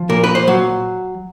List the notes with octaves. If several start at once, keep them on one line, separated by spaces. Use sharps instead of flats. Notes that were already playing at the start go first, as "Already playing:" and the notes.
Already playing: F3
A#2 A#4
B4
C5
F#3